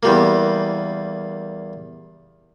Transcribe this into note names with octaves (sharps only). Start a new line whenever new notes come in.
E2 G3 A#3